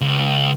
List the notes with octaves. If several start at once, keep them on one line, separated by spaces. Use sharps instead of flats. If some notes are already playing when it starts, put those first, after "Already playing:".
C#2